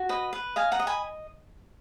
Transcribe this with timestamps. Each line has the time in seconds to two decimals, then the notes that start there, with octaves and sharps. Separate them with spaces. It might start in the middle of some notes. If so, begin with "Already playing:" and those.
Already playing: F#4
0.09 B4 D#5
0.33 B4
0.56 D#5 F5 G#5
0.72 F#5 A#5
0.80 D#5
0.87 G#5 B5